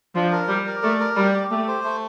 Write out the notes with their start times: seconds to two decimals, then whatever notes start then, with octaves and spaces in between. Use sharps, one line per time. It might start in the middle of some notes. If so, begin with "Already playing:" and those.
0.15 F3 D4
0.32 A#4
0.49 G3 D5
0.66 A#4
0.83 A3 D5
1.00 A#4
1.17 G3 D5
1.34 G4
1.51 A3 G4
1.68 C5
1.84 A3